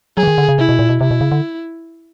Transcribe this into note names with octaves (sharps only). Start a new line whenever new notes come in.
F#3 G#4
E3
D#3
D3
C#3
C3 E4
B2
A#2
B2
C3 E4
B2
C#3
D3